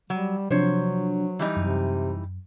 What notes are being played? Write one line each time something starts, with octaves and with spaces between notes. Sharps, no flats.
F#3 G3
C3 F3 F#3 D4 C5 C#5
E3 G3 D#4
F#2 C3